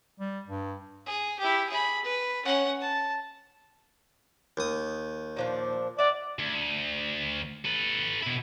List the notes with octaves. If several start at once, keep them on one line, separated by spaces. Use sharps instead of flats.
G3
G2
G#4
E4 G4
G#4 B5
B4
C#4 F#5
A5
D#2 D#6
A#2 F3 D4
D5 E5 F#5
D2
A4 B4
B2 E4